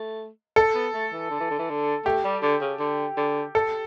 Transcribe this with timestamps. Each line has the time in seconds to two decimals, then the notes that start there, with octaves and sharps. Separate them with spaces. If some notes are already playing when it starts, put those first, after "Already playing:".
Already playing: A3
0.56 A4
0.74 B3
0.94 A3
1.13 E3
1.30 D3
1.40 E3
1.51 D3
1.59 E3
1.69 D3
2.05 A3 G4
2.24 G3
2.42 D3
2.61 C#3
2.79 D3
3.17 D3
3.55 A4